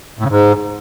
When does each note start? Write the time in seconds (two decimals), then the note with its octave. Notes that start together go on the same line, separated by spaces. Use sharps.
0.19 A2
0.24 C#3
0.29 G#2